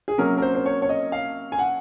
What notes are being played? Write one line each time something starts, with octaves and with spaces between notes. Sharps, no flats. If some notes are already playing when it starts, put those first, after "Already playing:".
G#4
C3 F#3 A#3 C#4 A#4
A#4
C5
C5
C#5
C#5
D#5
F5
G#5
F#5